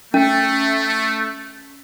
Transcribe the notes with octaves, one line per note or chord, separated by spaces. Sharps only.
A3 C#4